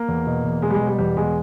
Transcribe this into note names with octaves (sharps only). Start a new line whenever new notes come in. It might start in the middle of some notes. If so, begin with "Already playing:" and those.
Already playing: A#3
E2
B2
E2
B2 G#3
G3
G#3
B2
G3
E2 G3
B2 G#3